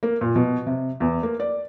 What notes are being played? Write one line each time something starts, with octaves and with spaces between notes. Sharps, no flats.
A#3
A#2
B2
C3
E2
A#3
D5